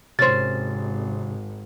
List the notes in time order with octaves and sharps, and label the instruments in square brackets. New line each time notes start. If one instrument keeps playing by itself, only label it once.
[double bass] G#1 [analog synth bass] C3 [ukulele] C#4 C5 [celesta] A6